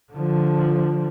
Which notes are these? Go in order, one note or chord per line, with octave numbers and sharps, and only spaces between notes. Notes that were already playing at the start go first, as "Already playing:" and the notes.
D3 F3